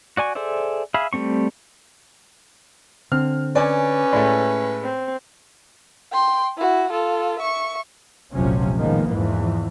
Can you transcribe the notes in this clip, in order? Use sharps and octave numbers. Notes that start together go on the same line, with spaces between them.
F#4 D5 G#5 C#6
G#4 A4 C5 D5 E5
G#4 E5 F5 B5
G3 A3 C4 C#6
D3 C4 F6
C#4 B4 D5 G#5
A2 G#3 A3 D5 C6
C4
G5 C6
E4 F#4
F4 A4
E5 C#6
F1 A#1 C3 F3 F#3 C#4
A2 D#3 F3 G#3 A#3 B3
E2 G#2 E3 F3